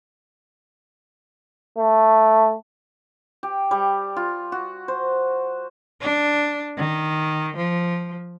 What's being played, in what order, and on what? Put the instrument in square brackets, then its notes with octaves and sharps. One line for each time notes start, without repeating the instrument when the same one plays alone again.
[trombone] A3
[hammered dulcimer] G4
G3
F4
F#4
C5
[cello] D4
D#3
F3